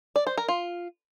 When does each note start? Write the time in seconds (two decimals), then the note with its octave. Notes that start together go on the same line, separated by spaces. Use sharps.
0.16 D5
0.27 C5
0.37 A#4
0.48 F4